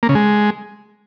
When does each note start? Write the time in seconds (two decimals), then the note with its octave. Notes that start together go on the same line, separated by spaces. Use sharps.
0.03 A#3
0.09 C#3
0.15 G#3